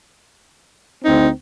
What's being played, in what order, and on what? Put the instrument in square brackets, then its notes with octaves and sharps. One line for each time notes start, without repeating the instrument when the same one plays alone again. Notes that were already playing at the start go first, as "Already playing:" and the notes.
[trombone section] D2 C4 [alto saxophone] D#4